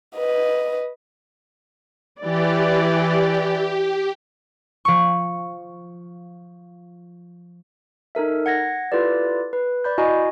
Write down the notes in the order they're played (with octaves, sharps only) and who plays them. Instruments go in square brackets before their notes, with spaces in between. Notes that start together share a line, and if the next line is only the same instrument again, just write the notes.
[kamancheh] B4 D#5
[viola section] E3 D5 [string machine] G4
[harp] F3 C#6
[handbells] D#4 A4 A#4 E5
F#5 G#6 A#6
E4 F4 G4 A4 B4 D5
B4
D5 B5 G6
E4 F#4 D#5 G#5 A#5